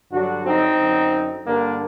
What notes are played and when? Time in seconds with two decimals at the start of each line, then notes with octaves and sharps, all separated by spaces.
0.11 G2 D3 F#3 D4 F#4
0.46 C4 D#4
0.78 F#2 D3 F#3
1.46 G2 D3 G3 A#3 D4